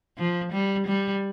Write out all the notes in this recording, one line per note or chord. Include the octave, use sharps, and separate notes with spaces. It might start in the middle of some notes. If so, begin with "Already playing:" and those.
F3
G3
G3